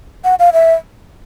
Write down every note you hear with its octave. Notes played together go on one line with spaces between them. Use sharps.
F#5
F5
E5